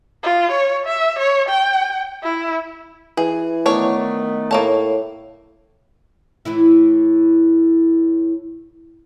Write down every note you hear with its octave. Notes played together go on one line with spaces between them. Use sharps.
F4
C#5
E5
C#5
G5
E4
E3 G#4
D#3 A3 B3 D4 C#5
A2 A#3 C#5 A5
A2 E3 E4